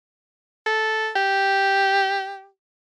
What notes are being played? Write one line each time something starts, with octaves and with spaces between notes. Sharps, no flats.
A4
G4